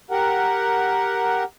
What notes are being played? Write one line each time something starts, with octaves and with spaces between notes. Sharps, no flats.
G4 A#4 F#5